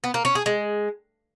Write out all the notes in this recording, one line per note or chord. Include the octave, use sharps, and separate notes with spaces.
B3
A#3
C#4
G#4
G#3